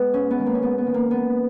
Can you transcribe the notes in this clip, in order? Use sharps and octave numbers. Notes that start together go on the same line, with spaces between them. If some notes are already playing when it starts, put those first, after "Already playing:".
Already playing: G#3 B3 B4 D#5
G#2 C#4
B3
D#3 G#3
A#3
C#4
G#2 B3
B3
D#3 G#3
A#3
E2 B3